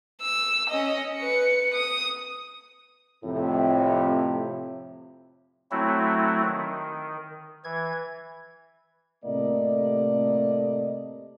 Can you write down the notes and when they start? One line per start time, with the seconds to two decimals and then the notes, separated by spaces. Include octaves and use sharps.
0.22 E6
0.70 C#4 D#5
1.17 B4 C#7
1.74 D#6
3.24 F2 A2 C3
5.71 F#3 A3 C4 E4 F#4
6.45 D#3
7.64 E3 G#6
9.25 A2 C3 A3 A#3 D5 D#5